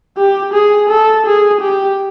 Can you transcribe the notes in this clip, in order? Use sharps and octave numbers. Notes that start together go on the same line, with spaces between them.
G4
G#4
A4
G#4
G4